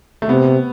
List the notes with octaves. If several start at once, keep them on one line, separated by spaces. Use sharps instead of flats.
A3
C3 B3